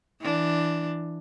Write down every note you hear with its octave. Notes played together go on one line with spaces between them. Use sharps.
E3 D4